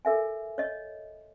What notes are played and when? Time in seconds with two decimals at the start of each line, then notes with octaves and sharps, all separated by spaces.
0.05 A4 A#4 E5 G#5
0.58 C#5 D#5